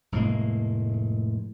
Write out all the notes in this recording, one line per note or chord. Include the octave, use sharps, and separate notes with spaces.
F1 A2 G#3 A#3